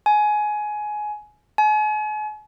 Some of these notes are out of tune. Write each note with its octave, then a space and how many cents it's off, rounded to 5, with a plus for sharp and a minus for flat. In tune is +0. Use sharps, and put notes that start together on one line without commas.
G#5 +20
G#5 +40